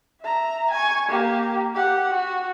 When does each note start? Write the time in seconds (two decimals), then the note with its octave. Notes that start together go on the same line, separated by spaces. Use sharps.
0.21 E5 A#5
0.71 G#5 C#6
1.09 A#3 G4
1.75 G4 F#5
2.13 F#4